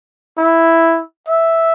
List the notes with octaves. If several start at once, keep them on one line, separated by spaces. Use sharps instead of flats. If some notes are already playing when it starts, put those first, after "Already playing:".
E4
E5